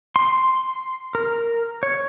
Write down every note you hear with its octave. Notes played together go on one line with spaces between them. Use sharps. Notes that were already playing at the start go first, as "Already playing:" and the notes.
C6
A#4
C#5